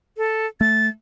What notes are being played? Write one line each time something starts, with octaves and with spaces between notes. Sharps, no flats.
A4
A3 A6